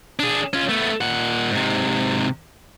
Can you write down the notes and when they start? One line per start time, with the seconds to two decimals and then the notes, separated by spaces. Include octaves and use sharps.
0.19 D4 G#4
0.53 C#4 F4
0.69 A3 B3
1.01 A#2 F#5
1.51 G#2 C3